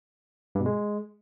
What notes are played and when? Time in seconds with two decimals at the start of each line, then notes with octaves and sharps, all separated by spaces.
0.55 G2
0.60 B2
0.66 G#3